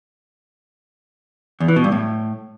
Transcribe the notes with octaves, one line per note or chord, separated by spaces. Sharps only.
E2
E3
B2
G2
A2